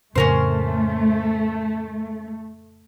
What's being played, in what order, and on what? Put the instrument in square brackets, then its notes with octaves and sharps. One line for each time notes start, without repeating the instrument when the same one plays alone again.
[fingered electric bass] F2 A2 C#3 [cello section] A3 [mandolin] C#4 A#4 C5